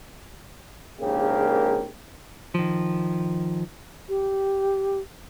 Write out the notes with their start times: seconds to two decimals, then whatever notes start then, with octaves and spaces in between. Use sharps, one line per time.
1.00 A#1 G#2 C#3 A#3 G4 A#4
2.54 D#3 F3
4.09 G4